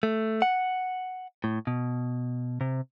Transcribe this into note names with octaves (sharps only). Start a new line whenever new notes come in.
A3
F#5
A2
B2
C3